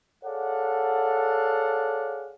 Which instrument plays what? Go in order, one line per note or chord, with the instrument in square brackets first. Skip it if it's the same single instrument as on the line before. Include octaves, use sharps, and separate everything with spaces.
[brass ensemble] G#4 A4 C#5 D5 F5 F#5